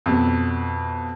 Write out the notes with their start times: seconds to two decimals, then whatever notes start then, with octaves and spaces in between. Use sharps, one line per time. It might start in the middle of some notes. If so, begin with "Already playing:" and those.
0.06 F2 B2